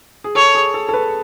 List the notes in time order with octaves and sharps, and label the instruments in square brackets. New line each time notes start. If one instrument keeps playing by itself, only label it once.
[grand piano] G#4
[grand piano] A4 [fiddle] C#5
[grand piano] G#4
A4
A4
B4